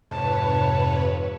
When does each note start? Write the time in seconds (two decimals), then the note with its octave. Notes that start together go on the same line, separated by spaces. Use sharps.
0.11 F2 G#2 C3 B4 C#5 A5